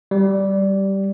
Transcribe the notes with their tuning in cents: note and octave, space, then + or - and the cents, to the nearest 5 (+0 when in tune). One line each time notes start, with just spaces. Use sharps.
G3 -10